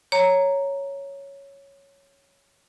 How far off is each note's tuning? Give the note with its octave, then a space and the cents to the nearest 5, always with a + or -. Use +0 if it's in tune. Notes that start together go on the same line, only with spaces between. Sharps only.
C#5 +0 A#5 -5